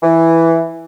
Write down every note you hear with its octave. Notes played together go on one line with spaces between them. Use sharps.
E3